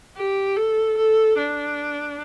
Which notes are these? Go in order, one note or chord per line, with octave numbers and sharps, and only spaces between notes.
G4
A4
A4
D4